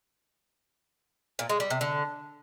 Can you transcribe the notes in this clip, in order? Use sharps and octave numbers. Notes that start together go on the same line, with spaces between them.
A#2
G#3
G3
C3
D3